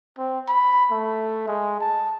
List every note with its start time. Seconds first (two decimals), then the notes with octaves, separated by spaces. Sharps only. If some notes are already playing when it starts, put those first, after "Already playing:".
0.18 C4
0.48 B5
0.91 A3
1.48 G#3
1.80 A5